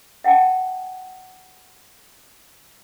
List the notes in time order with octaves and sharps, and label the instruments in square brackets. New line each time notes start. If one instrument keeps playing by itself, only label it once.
[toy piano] E5 F#5 G5 A5